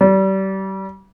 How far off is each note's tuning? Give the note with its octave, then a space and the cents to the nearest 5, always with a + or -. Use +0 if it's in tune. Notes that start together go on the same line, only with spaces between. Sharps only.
G3 -30